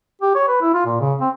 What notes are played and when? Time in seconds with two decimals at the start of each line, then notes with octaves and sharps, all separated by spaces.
0.22 G4
0.35 C#5
0.48 B4
0.61 E4
0.74 F4
0.85 A#2
1.00 C#3
1.21 C4